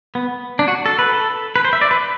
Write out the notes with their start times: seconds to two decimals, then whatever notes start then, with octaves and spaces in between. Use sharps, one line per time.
0.15 B3
0.59 D4
0.68 F#4
0.86 A4
0.99 B4
1.14 A4
1.56 B4
1.65 C5
1.73 E5
1.81 D5
1.91 B4